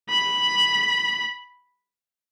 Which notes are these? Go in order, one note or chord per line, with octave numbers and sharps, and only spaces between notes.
B5